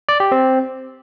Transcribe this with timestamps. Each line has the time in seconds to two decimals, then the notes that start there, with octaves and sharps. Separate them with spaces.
0.09 D5
0.20 G4
0.32 C4